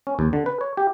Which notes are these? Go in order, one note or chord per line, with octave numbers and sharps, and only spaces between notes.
C#4
D#2
D3
B4
C#5
G4